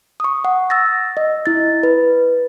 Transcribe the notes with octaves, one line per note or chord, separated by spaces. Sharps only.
C#6 D#6
F#5
E6 A6 A#6
D#5
E4 A6
B4